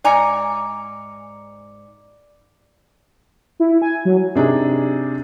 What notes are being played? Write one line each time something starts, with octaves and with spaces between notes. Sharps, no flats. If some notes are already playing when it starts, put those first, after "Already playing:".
G#2 D5 G#5 A#5 D6 C#7
E4
G#5
F#3
C3 D4 D#4 G#4